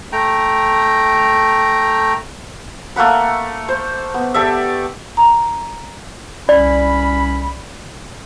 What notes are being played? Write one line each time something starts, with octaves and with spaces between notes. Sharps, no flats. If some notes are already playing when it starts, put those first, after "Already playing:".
A3 G5 A#5
A3 A#3 F#5 B5
C5
B3
G4 A4 D5 E5
A#5
C2 C#4 D5 B5